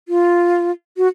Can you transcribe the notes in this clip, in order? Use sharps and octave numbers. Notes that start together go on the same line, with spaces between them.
F4
F#4